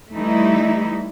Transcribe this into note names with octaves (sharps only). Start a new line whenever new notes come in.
E3 G3 A3 D#4 E4